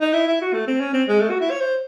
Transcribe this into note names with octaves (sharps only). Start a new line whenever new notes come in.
D#4
E4
E4
F#4
A3
C4
C#4
C4
G#3
A3
F#4
E4
C#5
C5